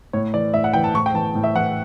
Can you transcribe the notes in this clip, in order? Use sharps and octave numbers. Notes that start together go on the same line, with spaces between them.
A2 C#5
E3 D5
A2 E5
F#5
E3 G5
A5
A2 C#6
G5
E3 A5
A2
E5
E3 F#5